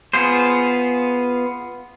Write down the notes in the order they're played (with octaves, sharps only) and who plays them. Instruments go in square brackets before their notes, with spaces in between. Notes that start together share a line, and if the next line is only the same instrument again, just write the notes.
[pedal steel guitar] B3 F4 G#4 C5